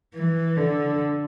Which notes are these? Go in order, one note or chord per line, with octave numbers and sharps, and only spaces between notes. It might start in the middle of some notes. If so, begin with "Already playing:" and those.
E3
D3